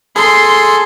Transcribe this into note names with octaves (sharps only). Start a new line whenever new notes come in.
G#4 A4 C6